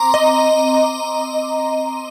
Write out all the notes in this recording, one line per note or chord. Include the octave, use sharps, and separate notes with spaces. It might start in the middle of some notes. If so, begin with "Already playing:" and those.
Already playing: C4 A#5 C6 D6
D#5